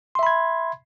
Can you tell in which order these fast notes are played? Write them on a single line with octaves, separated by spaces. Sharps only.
C6 E5 B5 G#6